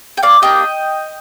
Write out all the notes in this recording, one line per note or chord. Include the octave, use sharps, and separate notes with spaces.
G5
D5 F5
A#3 D4 G4 D#5 G5